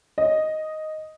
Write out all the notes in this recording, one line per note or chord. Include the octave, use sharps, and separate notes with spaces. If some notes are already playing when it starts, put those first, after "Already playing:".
D#5